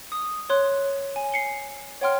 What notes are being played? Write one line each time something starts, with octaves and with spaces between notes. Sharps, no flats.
D#6
C#5 C6 F#6
G#5
C7 C#7 G7
C#5 F#5 G5 C6 F6